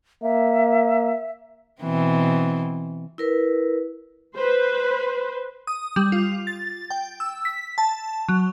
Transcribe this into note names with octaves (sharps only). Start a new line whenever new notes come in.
A#3 E5
B2 E3 C4
E4 A#4 B4
B4 C5
D#6
G3
F4
A6
G5
E6
B6
A5
F#3